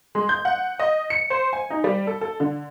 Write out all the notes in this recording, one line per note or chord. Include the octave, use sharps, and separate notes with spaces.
G#3
G6
F#5
D#5
C#7
C5
G#5
D#4
G3
A4
A4
D3